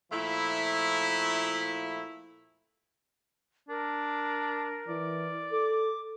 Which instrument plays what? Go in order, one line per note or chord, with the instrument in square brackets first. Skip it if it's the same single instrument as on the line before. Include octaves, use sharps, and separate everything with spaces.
[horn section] A#2 F3 A3 E4
[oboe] D4 [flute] A#4
[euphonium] E3 [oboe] D5
[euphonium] A4 [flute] D6